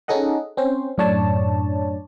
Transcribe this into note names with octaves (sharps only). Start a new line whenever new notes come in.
C#4 D#4 G#4 A4 D#5 F#5
C4 C#4 C5
F#2 A2 D4 C#5 D5 A5